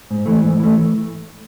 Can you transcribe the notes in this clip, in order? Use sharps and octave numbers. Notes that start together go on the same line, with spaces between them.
G#2
E3 A3
G#2
E3 A3